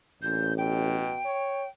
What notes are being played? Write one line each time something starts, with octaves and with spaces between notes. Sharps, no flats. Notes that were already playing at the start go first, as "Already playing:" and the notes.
A1 A#2 G6
B2 G5
C#5